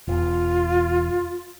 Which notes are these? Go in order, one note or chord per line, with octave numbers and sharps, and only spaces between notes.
E1 E2 F4